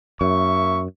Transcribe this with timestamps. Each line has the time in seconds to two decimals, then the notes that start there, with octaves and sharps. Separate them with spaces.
0.21 F#2 A#3 E5 C#6